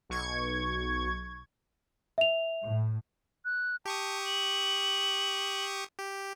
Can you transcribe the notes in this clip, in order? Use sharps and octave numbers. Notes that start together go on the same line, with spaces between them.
B1 C#6 G#6
E5 F7
A2
F#6
G4 A5 C#6 D#6
F#7
G4